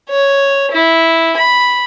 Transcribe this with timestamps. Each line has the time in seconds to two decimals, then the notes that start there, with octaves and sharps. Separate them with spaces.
0.10 C#5
0.72 E4
1.38 B5